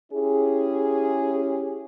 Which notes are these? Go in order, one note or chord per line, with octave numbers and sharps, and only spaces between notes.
C#4 E4 G4 G#4